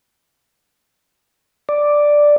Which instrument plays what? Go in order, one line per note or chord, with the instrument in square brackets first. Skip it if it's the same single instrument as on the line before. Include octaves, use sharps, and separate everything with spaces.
[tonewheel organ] D5